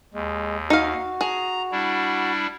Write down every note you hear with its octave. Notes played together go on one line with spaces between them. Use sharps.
D#2 G#3
D#4 F#4 F5
G#4 A#5
G3 D4 E4